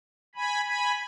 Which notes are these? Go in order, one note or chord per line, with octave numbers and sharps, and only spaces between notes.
G#5 B5
G#5 B5